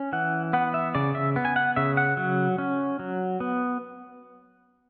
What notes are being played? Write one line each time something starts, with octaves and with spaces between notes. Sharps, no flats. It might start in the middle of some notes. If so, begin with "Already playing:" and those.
Already playing: C#4
E3 F#5
B3 F#5
E5
C#3 D5
E5
B3
G#5
F#5
C#3 E5
F#5
F#3
C#4
F#3
B3